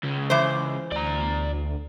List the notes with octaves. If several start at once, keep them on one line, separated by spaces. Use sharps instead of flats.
C#2 C#3
E3 C5
D2 D5 A#5